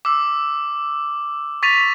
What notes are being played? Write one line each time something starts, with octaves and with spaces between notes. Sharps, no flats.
D6 E6
C#6 A6 B6 D#7 F7